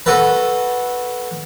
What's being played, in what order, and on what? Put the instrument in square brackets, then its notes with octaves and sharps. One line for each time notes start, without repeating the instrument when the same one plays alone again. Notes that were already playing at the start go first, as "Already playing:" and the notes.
[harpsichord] F#4 A4 B4